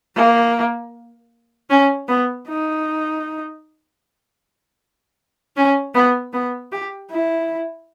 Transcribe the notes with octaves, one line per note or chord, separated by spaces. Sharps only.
A#3
C#4
B3
D#4
C#4
B3
B3
G4
E4